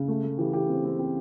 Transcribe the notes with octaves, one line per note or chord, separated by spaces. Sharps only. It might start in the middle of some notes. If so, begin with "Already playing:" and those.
Already playing: C#3
A3
A3
E3 G4
E3 G4
C4
C4
C4